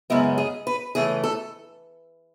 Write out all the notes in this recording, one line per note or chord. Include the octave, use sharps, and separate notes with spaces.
F#2 C#3 G#3 B3 E4
G#4
B4
C#3 E3 A3 G#4
A4